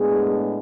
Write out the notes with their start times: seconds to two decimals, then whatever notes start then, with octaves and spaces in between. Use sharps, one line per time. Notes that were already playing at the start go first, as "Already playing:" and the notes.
Already playing: A2 G#3 B3 D4 G#4